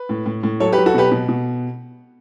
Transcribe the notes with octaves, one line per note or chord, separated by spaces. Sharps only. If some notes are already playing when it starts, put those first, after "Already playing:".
Already playing: B4
A2
A2
A2
F#3 A4 C#5
G4 B4
F#3
F#4 A4
B2 G4 B4
B2
B2